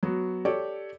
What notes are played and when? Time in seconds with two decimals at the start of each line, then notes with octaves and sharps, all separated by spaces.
0.03 F#3 B3 F#4
0.45 G4 A4 C#5 D5